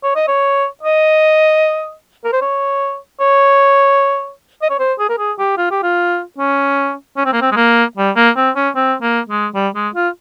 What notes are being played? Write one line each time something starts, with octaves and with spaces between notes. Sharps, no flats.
C#5
D#5
C#5
D#5
A#4
C5
C#5
C#5
D#5
C#5
C5
G#4
A#4
G#4
G4
F4
G4
F4
C#4
C#4
C4
A#3
C4
G#3
A#3
G3
A#3
C4
C#4
C4
A#3
G#3
G3
G#3
F4